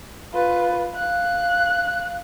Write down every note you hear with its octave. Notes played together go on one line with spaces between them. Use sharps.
F4 B4
F5 F#6